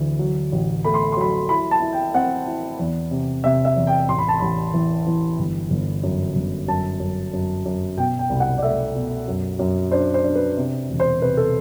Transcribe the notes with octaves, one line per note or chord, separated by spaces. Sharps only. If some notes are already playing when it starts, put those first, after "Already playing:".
Already playing: D2 E3
F#3
A1
A3 B5
C6
B5
C6
F#3 B5
E4 B5
A5
E4
G5
C4 F#5
E4
E2
C3
C3 E5
E5
E2
G5
A1 C6
B5
A5
A1 B5
E3
E3
G1
G1
F#2
G1
F#2 A5
F#2
F#2
F#2
B2 G5
G5
C2
F#5
D5
A3 E5
B2
F#2
F#2
D4 C5
C5
D4
B4
C3
E1
C5
C3 B4
A4